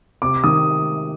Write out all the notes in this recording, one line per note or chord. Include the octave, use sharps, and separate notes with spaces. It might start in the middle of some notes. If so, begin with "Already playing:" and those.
C3 D6
D#3 D#6